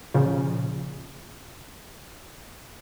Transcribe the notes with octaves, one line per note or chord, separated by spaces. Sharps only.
A#2 C#3 F3